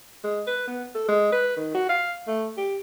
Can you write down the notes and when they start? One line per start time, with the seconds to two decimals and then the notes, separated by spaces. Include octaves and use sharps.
0.24 G#3
0.47 B4
0.67 B3
0.95 A4
1.08 G#3
1.32 B4
1.56 D#3
1.74 F#4
1.89 F5
2.27 A3
2.57 G4